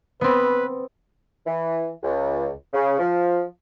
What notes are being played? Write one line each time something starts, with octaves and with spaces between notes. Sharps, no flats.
B3 C4 B4
E3
C#2
C#3
F3